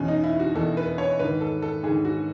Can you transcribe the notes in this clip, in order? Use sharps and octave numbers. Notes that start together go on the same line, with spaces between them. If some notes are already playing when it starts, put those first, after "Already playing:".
Already playing: E2 B2 C#4
D#4
E4
F#4
E2 B2 A4
B4
C#5
G#2 D#3 B4
A4
A4
G#2 D#3 G#4
F#4